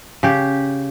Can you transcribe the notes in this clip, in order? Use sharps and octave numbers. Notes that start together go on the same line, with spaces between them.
C#3 G4